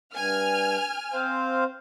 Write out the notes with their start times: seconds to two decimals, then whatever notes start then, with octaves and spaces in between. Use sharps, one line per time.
0.14 G2 G#5 F6
1.13 C4 C5 F5